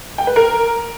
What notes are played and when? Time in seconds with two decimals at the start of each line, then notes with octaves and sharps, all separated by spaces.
0.18 G5
0.27 B4
0.36 A#4